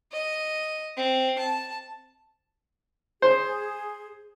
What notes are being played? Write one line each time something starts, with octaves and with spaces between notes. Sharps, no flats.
D#5
C4
A5
G#4 C5